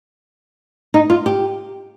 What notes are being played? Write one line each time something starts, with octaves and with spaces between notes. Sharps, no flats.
D#4
F4
G4